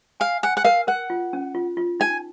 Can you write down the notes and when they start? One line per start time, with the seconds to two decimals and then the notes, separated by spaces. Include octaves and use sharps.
0.20 F5 G#5
0.43 F#5 G#5
0.57 F#5
0.65 A#4 F5
0.87 A#4 F#5
1.10 F4
1.33 C#4
1.55 F4
1.77 F4
2.00 D#4 G#5